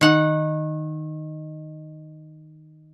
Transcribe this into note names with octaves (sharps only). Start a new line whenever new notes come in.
D#3 F#5